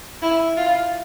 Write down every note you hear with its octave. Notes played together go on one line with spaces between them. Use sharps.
E4
F4